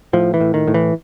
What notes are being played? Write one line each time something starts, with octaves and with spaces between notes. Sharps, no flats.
A2 F3
E3
A2
D#3
A2
E3